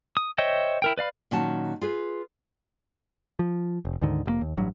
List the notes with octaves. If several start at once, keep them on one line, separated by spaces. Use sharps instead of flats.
D#6
C5 C#5 D#5 E5 G5
E4 A#4 G5
B4 D5 F5 B5
A#2 D#3 F#3 C#4 F#4 A5
F4 G#4 B4
F3
F1
D2 G#2 D3 D#3
F1 B2 A#3
D#2
A1 G2 F#3